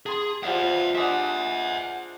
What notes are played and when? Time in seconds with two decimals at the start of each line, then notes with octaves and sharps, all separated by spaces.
0.06 G#4 A5 C6
0.43 F3 G3 E5 F#5 G#5
0.95 G#3 D4 E5 F#5